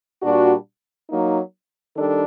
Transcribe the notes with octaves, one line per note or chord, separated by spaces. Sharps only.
A#2 G3 D4 F#4
F#3 A#3 D#4
D#3 G3 D4 A4